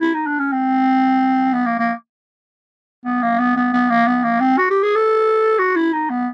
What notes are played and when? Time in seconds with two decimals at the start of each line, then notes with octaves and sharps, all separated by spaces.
0.01 E4
0.14 D#4
0.27 D4
0.39 C#4
0.52 C4
1.53 B3
1.66 A#3
1.79 A#3
3.05 B3
3.22 A#3
3.39 B3
3.56 B3
3.73 B3
3.90 A#3
4.07 B3
4.24 A#3
4.40 C4
4.57 F#4
4.70 G4
4.83 G#4
4.95 A4
5.59 F#4
5.76 E4
5.93 D#4
6.10 B3